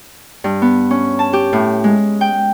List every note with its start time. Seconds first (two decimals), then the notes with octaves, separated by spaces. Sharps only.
0.44 G2
0.62 B3
0.91 C#4
1.19 A5
1.33 G4
1.53 A2
1.84 G#3
2.21 G5